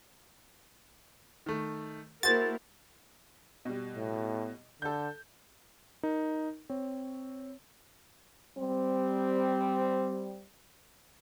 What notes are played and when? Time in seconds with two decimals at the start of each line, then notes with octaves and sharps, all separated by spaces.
1.46 D#3 A3
2.23 A#3 E4 F#4 G#4 A#4 C5 A6
3.65 B2 G3
3.96 A2
4.82 D3 A4 G6
6.03 D#4 A#4
6.69 C4 C#5
8.58 G3 C4